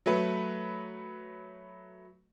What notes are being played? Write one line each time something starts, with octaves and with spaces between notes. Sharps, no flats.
F#3 A3 B4